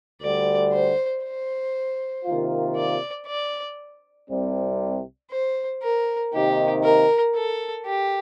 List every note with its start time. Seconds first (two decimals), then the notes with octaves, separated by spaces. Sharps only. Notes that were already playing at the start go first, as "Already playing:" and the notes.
0.21 D2 D3 G3 D5
0.72 C5
1.23 C5
2.25 C3 D#3 A#3 F4
2.76 D5
3.27 D5
4.29 C2 C3 G3 C4
5.31 C5
5.83 A#4
6.33 C3 D#3 A#3 D#4 G4
6.84 A#4
7.35 A4
7.86 G4